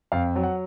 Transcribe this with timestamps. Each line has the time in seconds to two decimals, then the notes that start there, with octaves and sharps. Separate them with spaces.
0.12 F2 F5
0.36 F#3
0.44 F#5